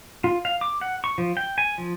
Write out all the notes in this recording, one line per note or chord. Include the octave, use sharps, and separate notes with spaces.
F4
F5
D6
F#5
C#6
F3
G5
G#5
F3